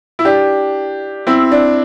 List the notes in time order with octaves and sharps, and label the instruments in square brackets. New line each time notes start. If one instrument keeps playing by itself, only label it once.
[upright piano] E4
D4 G4
C4 E4
D4